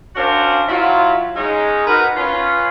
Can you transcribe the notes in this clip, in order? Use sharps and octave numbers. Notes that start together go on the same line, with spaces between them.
C#4 D4 F#4 A#4 C5 F5
F#3 E4 F4
G#3 C#4 D#4
D#4 F#4 A#4 B4
C#4 F4 B4